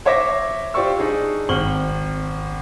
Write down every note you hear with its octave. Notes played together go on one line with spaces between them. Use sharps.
C5 C#5 E5 D6 A#6
F4 G4 C5 D5 C#6 E6
D4 D#4 G#4
G#1 C4 C#6 F6 F#7 G7